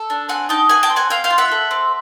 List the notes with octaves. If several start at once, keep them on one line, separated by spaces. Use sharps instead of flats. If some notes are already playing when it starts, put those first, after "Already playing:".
Already playing: A4
D4
C4 F#5 G#5
D#4 G5 A5
G#4 F#5 G#5
G5 A5
C4
F#5 G#5
C4 F5 G5
F5 G5
F4
E5 F#5
A4
C4